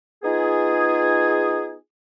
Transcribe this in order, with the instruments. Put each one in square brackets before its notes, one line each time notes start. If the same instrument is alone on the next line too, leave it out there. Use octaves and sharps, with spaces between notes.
[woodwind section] B3 D#4 F4 G#4